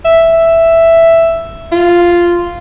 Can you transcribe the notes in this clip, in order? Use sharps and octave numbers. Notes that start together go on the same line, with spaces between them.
E5
F4